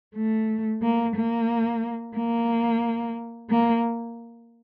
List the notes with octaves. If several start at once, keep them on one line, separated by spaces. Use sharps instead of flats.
A3
A#3
A#3
A#3
A#3